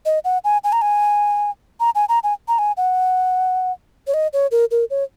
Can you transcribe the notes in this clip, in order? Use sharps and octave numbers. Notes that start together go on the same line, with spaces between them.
D#5
F#5
G#5
G#5
A#5
G#5
A#5
G#5
A#5
G#5
A#5
G#5
F#5
C#5
D#5
C#5
A#4
A#4
C#5